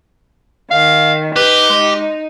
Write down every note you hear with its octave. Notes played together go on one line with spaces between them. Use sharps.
D#3 F5
D#4 G4 B4
G#3